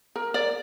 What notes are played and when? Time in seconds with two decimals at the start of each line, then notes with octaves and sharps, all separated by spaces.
0.16 A#4
0.34 D5